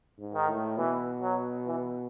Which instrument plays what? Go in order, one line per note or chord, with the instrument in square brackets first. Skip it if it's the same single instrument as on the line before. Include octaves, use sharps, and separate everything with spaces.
[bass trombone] G#2
[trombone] D#3
[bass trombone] A2
[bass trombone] B2 [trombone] E3
[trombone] F#3
E3